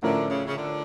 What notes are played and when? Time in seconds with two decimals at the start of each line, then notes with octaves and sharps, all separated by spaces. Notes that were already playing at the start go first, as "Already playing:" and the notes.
0.02 A2 D3 F3 C#4 E4 A#4
0.29 C#3
0.46 C#3
0.55 D3